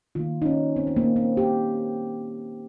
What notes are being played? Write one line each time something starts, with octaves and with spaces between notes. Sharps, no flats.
D#3 A#3 F4
D#4
C#4
C4
C4
A#3
C4
G4